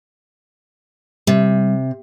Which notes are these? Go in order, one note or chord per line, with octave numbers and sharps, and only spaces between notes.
C3 G3